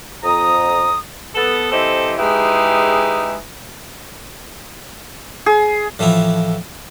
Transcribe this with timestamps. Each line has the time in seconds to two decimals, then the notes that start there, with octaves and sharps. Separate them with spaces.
0.24 F2 A#5 D#6
1.35 B3 A4
1.71 E3 C4 G4 A4 C5 D#5
2.18 G#3 D#4 E4 G4 G#4 B4
5.46 G#4
5.99 A2 E3 F3 E4